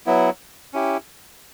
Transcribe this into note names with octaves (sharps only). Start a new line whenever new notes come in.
F#3 B3 E4
C#4 E4 G4